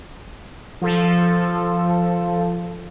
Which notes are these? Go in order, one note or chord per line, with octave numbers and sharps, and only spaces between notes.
F3 A4